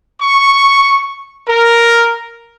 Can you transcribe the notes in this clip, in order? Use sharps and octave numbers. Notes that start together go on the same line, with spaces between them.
C#6
A#4